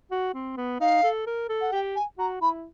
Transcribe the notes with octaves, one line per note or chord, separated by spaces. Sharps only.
F#4
C4
B3
D#4 F5
A4
A#4
A4
F#5
G4 G5
G#5
F#4 A#5
E4 B5